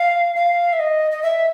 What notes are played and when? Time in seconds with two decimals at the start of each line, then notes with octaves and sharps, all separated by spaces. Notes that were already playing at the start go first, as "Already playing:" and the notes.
Already playing: F5
0.35 F5
0.73 E5
0.79 D#5
1.11 D#5
1.23 E5